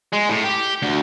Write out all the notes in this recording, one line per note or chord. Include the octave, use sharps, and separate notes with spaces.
G#3
A2
G4
D2